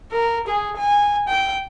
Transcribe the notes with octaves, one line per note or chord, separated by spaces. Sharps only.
A#4
G#4
G#5
G5